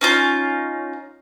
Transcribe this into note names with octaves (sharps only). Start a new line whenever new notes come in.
C#4 D#4 F4